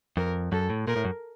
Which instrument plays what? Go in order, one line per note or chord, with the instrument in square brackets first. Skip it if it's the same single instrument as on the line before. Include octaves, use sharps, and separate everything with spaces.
[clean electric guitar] F2 [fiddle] A#4
[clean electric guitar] F#2 [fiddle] A4
[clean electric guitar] A2
[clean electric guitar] A#2 [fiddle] A#4
[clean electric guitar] A2
F#2